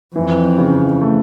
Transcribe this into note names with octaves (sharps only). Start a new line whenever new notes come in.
F2 E3
C#3
A3